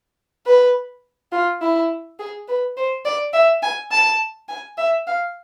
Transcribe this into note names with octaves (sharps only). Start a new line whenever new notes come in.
B4
F4
E4
G#4
B4
C5
D5
E5
G#5
A5
G#5
E5
F5